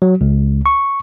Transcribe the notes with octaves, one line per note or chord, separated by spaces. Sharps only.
F#3
C#2
C#6